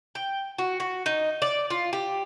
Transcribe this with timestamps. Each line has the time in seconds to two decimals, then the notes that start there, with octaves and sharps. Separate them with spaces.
0.15 G5
0.58 F#4
0.80 F#4
1.06 D#4
1.42 D5
1.70 F4
1.93 G4